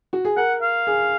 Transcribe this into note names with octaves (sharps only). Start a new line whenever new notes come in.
F#4
G#4
A#4 F#5
F5
G#4